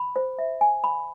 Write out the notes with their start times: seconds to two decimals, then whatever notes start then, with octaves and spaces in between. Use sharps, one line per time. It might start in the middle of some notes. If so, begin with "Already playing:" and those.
Already playing: B5
0.16 C5
0.39 E5
0.61 G#5
0.84 B5